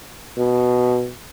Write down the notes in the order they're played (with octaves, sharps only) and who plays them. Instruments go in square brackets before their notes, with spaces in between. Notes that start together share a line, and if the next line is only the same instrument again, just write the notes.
[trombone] B2